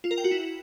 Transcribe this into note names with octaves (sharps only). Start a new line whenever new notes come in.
F4
A#4
G5
F#4
E4